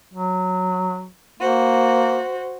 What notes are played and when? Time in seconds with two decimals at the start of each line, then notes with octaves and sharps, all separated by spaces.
0.14 F#3
1.40 A#3 F#4 C5